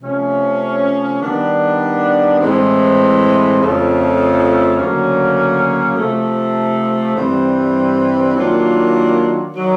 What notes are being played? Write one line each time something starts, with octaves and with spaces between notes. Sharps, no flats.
C3 F3 A3 C#4
D#3 G3 B3 D4
A2 E3 G#3 C4
F2 C#3 F3 A3
D2 C#3 F#3 A#3 C#4
C3 F3 A3
G2 E3 G3 C4
D#3 F#3 A#3 D4 F4
D#3 F#3